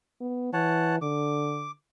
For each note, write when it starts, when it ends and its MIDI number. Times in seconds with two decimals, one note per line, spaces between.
0.21 0.53 59
0.53 0.99 52
0.53 0.96 73
0.53 0.96 78
0.53 0.96 81
1.02 1.71 50
1.02 1.71 86